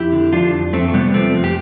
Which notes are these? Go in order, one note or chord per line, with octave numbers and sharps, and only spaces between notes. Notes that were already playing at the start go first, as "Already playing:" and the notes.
Already playing: F2 E4 G4
D3
F3 D4 F4
F2
F2 A3 C4
A3
C3 G3 B3
F3 A3 C4
F2
G4